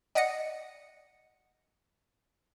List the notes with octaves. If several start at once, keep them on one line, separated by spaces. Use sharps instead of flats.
D5 D#5 F#5 D#6 A#6 C#7